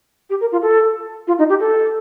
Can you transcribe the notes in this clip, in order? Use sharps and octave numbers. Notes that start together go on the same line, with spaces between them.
G4
A#4
F4
A4
F4
D#4
G4
A4